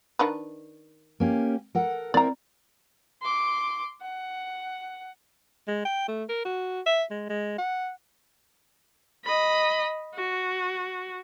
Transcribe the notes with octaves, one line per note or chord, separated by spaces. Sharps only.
D#3 D4 B4
A#3 C#4 G4
A4 A#4 F#5
C4 E4 A#4 D5 A#5
C6 D6
F#5
G#3
G5
A3
A#4
F#4
E5
G#3
G#3
F#5
D#5 B5
F#4